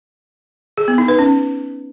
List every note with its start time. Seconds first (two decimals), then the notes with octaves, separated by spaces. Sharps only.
0.78 G#4
0.88 B3
0.98 D#4
1.08 B4
1.19 C#4